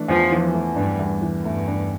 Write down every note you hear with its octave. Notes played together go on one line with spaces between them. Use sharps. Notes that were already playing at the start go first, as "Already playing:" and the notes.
Already playing: E3 A3 D4
E2 F3
E3
A3
G2 D4
E2
E3
G2 A3
D4